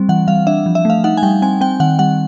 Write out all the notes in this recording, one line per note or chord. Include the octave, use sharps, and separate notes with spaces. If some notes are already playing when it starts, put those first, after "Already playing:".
Already playing: G3 C4
E3 F#5
G3 F5
D4 E5
F3
E5
A3 F5
D#4 F#5
G#5
G3 G5
C4 G#5
C4 G5
D#3 F#5
G3 F#5